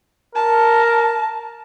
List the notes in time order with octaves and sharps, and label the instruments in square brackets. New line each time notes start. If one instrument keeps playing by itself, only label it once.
[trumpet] A#4 [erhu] A5